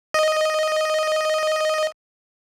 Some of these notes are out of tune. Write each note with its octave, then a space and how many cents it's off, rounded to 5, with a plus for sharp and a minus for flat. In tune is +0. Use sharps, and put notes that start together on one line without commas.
D#5 +0